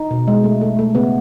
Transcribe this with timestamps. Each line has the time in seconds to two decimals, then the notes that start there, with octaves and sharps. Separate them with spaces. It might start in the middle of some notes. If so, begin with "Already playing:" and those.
Already playing: D#4
0.11 B2
0.28 G#3
0.44 A3
0.62 A3
0.79 A3
0.95 C#3 B3